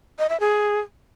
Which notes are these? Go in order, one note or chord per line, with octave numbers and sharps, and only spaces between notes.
D#5
E5
G#4